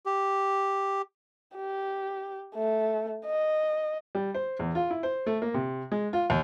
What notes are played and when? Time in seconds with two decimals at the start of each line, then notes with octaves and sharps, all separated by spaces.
0.06 G4
1.55 G4
2.55 A3
3.25 D#5
4.15 G3
4.34 C5
4.59 E2
4.75 F4
4.91 E4
5.03 C5
5.26 A3
5.42 A#3
5.54 C3
5.92 G#3
6.13 F4
6.30 D#2